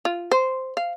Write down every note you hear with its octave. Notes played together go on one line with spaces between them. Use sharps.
F4
C5
F5